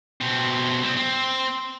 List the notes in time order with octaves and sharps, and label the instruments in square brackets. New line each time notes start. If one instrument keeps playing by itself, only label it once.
[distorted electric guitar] B2 C4
C2 C4
C4